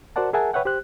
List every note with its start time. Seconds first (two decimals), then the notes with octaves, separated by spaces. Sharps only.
0.16 F#4 A#4 C5 D5 F#5 A5
0.33 G#4 A#4 E5 F#5 G#5 A5
0.53 B4 C#5 E5 F#5 G5
0.65 G4 C5 F#6